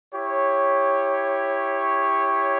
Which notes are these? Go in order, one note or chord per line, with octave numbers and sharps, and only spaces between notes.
E4 G4 C#5